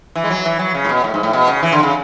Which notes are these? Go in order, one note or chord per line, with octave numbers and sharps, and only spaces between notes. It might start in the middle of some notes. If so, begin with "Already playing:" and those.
E3
G#3
F#3
E3
F#3
C#3
A2
B2
A2
G#2
A2
B2
C#3
E3
D3
C#3